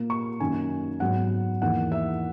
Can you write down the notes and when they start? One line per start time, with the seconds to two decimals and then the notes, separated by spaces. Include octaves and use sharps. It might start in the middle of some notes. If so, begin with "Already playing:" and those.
Already playing: A#2 A#3
0.10 C#6
0.40 F#2 D#3 A#3 G#5
1.00 G#2 F#3 B3 F#5
1.62 E2 D#3 A#3 F#5
1.92 E5